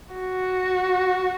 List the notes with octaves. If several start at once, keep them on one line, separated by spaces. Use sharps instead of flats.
F#4